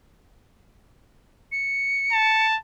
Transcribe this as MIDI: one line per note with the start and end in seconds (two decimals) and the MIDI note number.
1.52 2.46 97
2.13 2.57 81